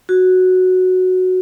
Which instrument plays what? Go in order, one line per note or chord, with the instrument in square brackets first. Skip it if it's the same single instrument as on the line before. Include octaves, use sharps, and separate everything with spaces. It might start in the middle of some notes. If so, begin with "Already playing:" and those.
[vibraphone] F#4